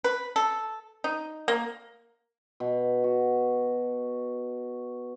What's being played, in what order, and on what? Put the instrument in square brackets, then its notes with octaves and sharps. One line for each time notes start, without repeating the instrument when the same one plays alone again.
[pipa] B4
A4
D#4
A#3
[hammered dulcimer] B2
F#4